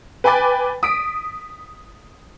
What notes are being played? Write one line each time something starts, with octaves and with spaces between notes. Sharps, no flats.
B4 G5 G#5 B5 D6 A6
D#6 B6 D7